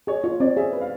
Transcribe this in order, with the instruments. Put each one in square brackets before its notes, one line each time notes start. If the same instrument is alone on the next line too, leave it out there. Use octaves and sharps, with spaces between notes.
[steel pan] G#4 [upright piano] C#5
[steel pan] F4 [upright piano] C#5
[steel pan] C4 [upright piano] D5
[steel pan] G#4 [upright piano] E5
[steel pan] B4
[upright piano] F5